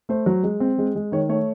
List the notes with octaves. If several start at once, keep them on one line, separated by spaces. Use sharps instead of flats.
A3 C5
F#3
G#3
C4
G#3
G#3
D#3 C#5
A3 C#5